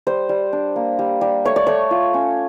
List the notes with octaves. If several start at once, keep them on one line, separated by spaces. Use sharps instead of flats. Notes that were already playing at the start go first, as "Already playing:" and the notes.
G3 C5
G3
D4
A#3
G3
G3
A3 C#5
D5
A3 C#5
F4
C#4